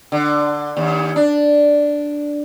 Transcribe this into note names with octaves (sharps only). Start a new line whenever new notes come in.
D3
D#2
D4